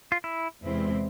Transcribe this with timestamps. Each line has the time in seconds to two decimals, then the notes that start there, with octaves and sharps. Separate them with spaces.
0.12 F4
0.24 E4
0.62 E2 C3 G#3 C4 E4